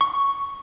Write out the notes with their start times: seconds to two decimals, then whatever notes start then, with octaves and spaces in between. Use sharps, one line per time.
0.01 C#6